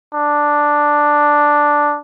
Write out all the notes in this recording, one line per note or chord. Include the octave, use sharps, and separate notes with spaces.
D4